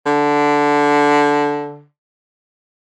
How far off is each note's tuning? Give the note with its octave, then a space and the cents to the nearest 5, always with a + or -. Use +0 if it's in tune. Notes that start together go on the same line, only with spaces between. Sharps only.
D3 -10